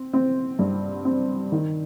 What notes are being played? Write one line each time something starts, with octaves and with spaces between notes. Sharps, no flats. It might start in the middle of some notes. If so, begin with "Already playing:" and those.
Already playing: C4
C4
G2
C4
D#3